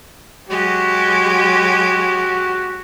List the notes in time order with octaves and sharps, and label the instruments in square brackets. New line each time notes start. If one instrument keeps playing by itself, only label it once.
[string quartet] F#3 G#3 G4 [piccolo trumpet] F#4